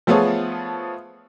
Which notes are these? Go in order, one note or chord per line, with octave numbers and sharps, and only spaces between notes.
F3 A3 B3 F4 G#4 C#5